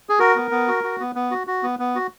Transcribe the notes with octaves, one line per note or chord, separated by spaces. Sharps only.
G#4
F#4 A#4
B3
B3
F#4
F#4
B3
B3
F#4
F#4
B3
B3
F#4